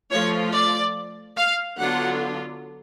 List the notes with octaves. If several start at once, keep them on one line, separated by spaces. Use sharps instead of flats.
F3 A3 F4 C#5
D5
F5
D3 F#3 B3 D4 F4 F#5